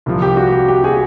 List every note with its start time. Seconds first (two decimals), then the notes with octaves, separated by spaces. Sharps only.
0.06 C2 C3 F3
0.22 G4
0.37 F#4
0.52 G4
0.68 G4
0.84 F#4 G#4